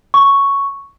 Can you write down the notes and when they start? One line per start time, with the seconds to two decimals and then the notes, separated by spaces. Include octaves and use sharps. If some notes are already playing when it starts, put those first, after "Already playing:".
0.14 C#6